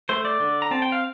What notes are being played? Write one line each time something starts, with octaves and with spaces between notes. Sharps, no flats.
A3 C5
D5
D3
A#5
C4 A5
G5
F5